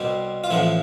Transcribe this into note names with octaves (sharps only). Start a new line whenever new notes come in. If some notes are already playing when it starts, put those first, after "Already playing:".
Already playing: C2 B2 G3 C4
F4
A1 A2 F3 B3 E4